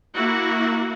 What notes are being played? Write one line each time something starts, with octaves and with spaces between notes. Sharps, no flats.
A#3 E4 F#4